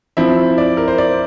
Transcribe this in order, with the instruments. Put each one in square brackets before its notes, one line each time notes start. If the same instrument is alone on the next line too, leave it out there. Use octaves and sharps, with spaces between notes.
[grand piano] F3 C4 E4 E5
D5
A#4
C5
D5